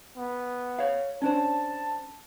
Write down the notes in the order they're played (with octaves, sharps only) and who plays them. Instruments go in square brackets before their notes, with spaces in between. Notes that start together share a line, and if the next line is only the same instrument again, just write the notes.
[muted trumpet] B3
[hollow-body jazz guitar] C#5 F5
[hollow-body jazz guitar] C#4 D4 C5 [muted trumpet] A5